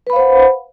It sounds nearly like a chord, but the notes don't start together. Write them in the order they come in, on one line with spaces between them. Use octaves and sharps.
B4 B5 F5 C5 F#5